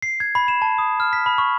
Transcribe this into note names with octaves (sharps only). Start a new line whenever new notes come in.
C7
G#6
B5
E7
A5
D#6
F6
B6
B5
C#6